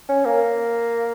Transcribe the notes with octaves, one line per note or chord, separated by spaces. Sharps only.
C#4
A#3